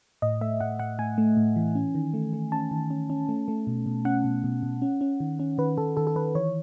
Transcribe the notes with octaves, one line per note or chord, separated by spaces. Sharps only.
A2 D#5
A3 E5
A2 F#5
A2 F#5
A2 G#5
A3
A2
E3
C#4
D#3
A3
A3
C#4 A5
D#3
C#4
C#4
A3
A3
B2
B2
C#4 F#5
B2
B2
B2
C#4
C#4
D#3
C#4
D#3 B4
D#3 A4
D#3 A4
A4
D#3 B4
E3 C#5